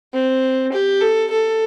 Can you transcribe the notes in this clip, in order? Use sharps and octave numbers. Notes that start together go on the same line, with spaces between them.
C4
G4
A4
A4